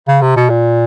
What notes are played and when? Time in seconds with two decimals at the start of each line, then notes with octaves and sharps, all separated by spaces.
0.08 C#3
0.22 C3
0.36 B2
0.50 A#2